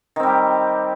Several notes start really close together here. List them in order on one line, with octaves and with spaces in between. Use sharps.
D#3 C4 G3 G4